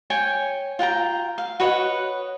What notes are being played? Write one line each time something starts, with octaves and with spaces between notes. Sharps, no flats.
C#5 G5 G#5
F4 F#5 G5 A#5
F5
F#4 B4 C#5 D#5